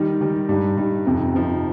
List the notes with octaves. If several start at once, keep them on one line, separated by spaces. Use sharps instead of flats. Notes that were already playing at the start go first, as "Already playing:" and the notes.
Already playing: D#3 G3 D#4
D#3 G3 D#4
G2 G3 D#4
G2 G3 D#4
F2 C3 F3 D#4
F2 C3 F3 D#4